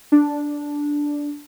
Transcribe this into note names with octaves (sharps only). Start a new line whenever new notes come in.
D4